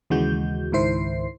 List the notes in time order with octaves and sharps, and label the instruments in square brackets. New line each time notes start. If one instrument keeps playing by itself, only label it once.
[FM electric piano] D#2 C#3 E3 G#3 F#4 G6
C#2 G#2 D#3 E4 C5 C7